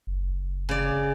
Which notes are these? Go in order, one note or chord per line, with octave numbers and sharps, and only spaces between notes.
F#1
C#3 D5